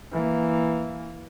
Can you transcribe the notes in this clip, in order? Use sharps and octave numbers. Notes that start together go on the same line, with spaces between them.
E3 A#3